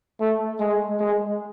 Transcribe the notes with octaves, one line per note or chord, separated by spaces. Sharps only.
A3
G#3
G#3